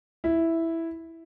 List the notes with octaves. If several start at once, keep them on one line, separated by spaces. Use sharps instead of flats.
E4